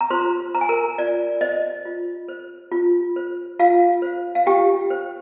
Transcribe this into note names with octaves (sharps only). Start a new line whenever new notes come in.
A#5
F4 C5 C6
C5 A#5
G#5
A#4 A#5
F4 D5
C5 D#5
F4
C5
F4
C5
F4 F5
C5
F5
F4 G4 G5
C5